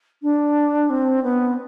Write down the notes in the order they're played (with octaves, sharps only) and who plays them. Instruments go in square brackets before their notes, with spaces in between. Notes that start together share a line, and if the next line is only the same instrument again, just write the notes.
[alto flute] D4
C4
B3